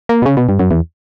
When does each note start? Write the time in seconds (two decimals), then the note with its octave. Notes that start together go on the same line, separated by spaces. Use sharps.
0.09 A#3
0.22 B2
0.26 C#3
0.37 B2
0.49 G2
0.59 F#2
0.71 E2